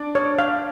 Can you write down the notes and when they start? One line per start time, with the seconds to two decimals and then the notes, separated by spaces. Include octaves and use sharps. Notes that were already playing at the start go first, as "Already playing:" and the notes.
Already playing: D4 D5
0.15 C#5
0.39 F5